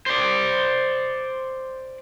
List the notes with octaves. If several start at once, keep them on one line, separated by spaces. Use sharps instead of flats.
C5 D5